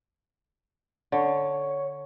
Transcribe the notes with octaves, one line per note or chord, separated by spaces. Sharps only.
D3 C#5